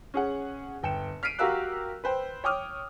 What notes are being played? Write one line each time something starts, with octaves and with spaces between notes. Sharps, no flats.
C#4 G#4 F#5
G1 G5 C#7 E7
F6 B6 C7 D7 D#7
F#4 G4 A#4 F5 E6 F#6
B4 C5 G5
C#5 G5 D6 D#6 F6